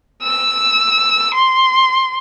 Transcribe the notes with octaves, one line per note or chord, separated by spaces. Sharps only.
E6
C6